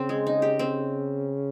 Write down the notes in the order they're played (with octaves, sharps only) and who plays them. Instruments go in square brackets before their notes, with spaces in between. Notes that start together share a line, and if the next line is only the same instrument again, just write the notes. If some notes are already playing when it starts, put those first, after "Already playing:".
Already playing: [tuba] C#3 [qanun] C4
[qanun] G#3
D#4
G4
C4